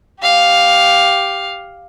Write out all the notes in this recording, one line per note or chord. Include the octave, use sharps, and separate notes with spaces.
G4 F5